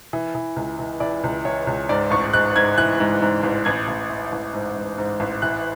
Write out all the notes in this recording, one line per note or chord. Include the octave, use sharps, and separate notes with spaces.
E3
E3
C#2
E3
E3 D5
C#2
E3 C#5
C#2
G#2 D5
A1 C#6
G#2 F#6
G#2 G#6
E3 F#6
G#2
G#2
A1
A1 G#6
A1
E3
A1
G#2
G#2
G#2
A1
E3 F#6